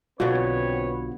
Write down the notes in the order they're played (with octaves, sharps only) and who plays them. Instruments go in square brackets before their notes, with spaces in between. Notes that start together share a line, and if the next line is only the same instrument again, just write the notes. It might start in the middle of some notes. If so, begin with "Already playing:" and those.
[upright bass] B1 [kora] B2 D3 [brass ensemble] C4 B4 C#5 [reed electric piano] F4 F#4